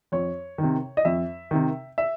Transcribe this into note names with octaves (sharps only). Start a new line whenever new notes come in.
F2 C#5
D#3
C3
D#5
F2 E5
C3 D#3
E5